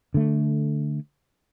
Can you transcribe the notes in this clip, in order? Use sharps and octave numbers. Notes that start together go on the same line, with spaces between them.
D3 A3